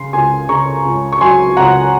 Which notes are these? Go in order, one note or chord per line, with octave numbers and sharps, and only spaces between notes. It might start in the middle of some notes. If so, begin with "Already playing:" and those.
Already playing: C#3 C6
C#2 G#5 C6
C#3 A#5 C#6
C#2
C#6
F#3 G#5 C6
C#2 F#5 A#5